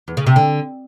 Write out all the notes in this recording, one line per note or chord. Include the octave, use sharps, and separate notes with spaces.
E2
C#3
C3
D3